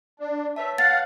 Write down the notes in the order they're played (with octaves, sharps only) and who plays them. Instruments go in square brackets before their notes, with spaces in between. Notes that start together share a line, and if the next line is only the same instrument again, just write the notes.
[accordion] D4
[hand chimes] B4 C#5 A5 [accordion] E5
[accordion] F5 F#5 [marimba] A6